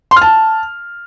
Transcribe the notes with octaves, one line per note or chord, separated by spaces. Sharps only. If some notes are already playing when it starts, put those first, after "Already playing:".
C6
F6
A5